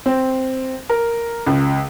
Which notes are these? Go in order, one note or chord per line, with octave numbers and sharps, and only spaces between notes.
C4
A#4
C#2